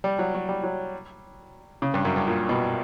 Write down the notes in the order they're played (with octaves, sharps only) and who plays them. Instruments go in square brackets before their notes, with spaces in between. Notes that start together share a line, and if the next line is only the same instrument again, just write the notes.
[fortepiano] G3
F#3
F#3
G3
F#3
C#3
G2
F#2
G2
A#2
B2